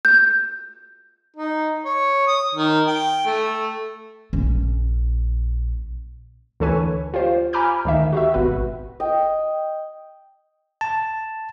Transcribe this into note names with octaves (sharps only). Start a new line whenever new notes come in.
G6
D#4
C#5
D#6
D#3
G5
A3
A#1 C#4
D2 E3 A4 B4 C#5 G#5
F4 G4 C5
G#5 A#5 B5 D6 F6 G6
D2 D#3 E5
F#4 G4 E5
G#1 B2 F#4 B4
D#5 G5
A5